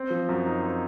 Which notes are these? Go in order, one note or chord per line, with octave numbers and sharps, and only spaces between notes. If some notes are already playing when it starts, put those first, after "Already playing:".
Already playing: C4
F3
F#2
D#4
C4